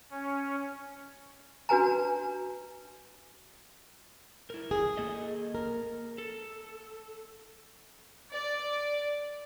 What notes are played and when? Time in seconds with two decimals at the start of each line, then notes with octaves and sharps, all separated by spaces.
0.11 C#4
1.69 D4 F#4 B4 G#5 A#5
4.50 E4 A#4
4.71 G#4
4.97 A#3 A4 D#5
5.55 A#4
6.18 A4
8.32 D5